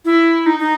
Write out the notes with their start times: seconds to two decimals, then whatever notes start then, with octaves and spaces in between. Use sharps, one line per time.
0.05 E4
0.46 D#4
0.59 D#4